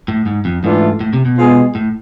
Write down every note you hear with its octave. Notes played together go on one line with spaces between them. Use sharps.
A2
G#2
F2
G#2 E3 A3 D4 F4 A4
A2
C3
B2
G#3 B3 F4 G#4
A2